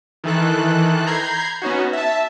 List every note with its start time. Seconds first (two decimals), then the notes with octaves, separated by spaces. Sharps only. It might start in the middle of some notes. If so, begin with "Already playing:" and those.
0.24 D#3 E3 A4 F#6
1.07 A#5 B5 G6 G#6 C7
1.62 B3 C#4 D#4 F#4
1.93 E5 A5